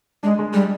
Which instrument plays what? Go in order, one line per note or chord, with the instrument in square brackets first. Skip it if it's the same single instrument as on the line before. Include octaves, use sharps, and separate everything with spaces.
[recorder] G#3 [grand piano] D4
[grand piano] G#3
[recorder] G3 [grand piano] G#3